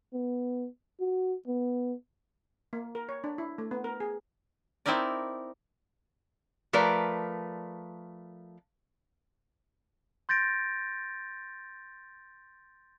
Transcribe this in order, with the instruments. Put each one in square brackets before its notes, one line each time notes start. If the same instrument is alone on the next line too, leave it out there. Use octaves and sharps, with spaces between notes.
[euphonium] B3
F#4
B3
[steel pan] A#3
A#4
C#5
D4
E4
A3
B3
A#4
G#4
[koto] C4 D#4 E4 A#4 D5
[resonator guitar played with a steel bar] F3 A3 A#4 B4 D5
[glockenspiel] C6 G6 A6 A#6 D7